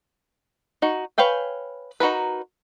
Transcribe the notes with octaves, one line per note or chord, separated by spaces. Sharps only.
D#4 F#4
B4 C#5 F5 G5 G#5
D#4 F#4 A#4 B4